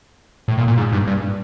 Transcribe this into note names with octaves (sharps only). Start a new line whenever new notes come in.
A2
A#2
A#2
G#2
G2
G2